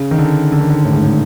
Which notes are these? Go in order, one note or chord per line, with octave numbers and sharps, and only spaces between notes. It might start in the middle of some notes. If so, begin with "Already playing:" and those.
Already playing: C#3
D#3
D3
D3
D#3
D3
A2
G#2
A2